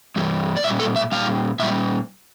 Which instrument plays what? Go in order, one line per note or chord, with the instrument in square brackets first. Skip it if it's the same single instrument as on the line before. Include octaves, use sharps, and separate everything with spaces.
[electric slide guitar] G2 E3 G3
D5
A#2 E5
G3
A4
E5
A#2 G3 F5
A#2 G3 E5